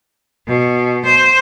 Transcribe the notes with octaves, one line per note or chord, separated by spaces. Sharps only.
B2
C5